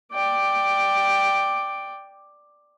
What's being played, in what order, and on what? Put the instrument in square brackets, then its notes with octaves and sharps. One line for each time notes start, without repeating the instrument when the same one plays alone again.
[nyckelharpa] D5 G5